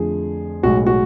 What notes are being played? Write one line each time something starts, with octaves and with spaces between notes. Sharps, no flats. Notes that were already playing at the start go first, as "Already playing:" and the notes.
Already playing: F2 D3 F3 A3 G#4
B1 A2 G#3 F#4
F#4